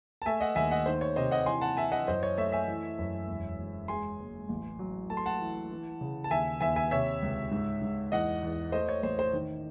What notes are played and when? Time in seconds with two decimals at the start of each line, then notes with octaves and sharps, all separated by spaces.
0.22 A5
0.26 A3 E5 G#5
0.40 D#5 F#5
0.56 D#2 E5 G#5
0.71 D#5 F#5
0.86 D#3 C5
1.01 C#5
1.16 C3 C5 D#5
1.31 D#5 F#5
1.46 E3 G#5 C6
1.61 F#5 A5
1.77 E3 E5 G#5
1.92 D#5 F#5
2.07 F#2 C5 D#5
2.23 C#5
2.38 A3 C#5 E5
2.52 E5 G#5
2.68 E3
2.98 F#2
3.28 E1
3.59 E1
3.88 G#3 G#5 C6
4.20 F#1
4.49 A1
4.79 F#3
5.10 A3 A5
5.17 C6
5.26 F#5 A5
5.40 E3
5.71 E3
6.01 C#3
6.24 A5
6.31 D#2 E5 G#5
6.61 D#2 E5 G#5
6.76 E5 G#5
6.91 C3 C#5 E5
7.22 C#2
7.51 G#2
7.82 G#2
8.12 E2 D#5 F#5
8.43 E2
8.72 A3 C5 D#5
8.89 C#5
9.03 A1 C5
9.19 C5
9.33 D#3